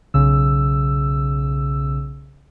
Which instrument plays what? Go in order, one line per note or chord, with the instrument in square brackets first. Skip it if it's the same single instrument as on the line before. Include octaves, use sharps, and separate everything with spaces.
[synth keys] B1 C#3 E6